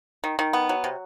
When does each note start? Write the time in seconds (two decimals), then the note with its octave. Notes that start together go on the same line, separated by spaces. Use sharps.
0.24 D#3
0.39 D#3
0.53 B3
0.69 F#3
0.84 C3